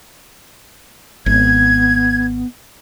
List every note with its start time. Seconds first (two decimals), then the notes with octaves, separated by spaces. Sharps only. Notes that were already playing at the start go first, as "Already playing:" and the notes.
1.26 G#1 B3 G#6